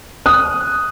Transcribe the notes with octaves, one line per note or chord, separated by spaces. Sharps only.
D#6 F#6